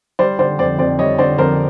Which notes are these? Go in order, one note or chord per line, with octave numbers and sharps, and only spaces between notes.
G3 C5 D5
D3 C5 D5
F2 C5 D5
F2 C5 D5
G3 C#5 D#5
D3 C5 D5
F2 A#4 C5